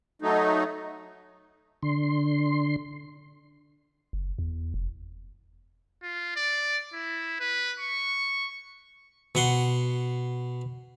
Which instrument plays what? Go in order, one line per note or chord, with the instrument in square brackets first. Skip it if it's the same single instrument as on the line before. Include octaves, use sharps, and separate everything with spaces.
[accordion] F#3 A3 D#4
[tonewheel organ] D3 C6
[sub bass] F#1
E2
F1
[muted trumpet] F4
D5
E4
B4
C#6
[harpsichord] B2 F#5 C6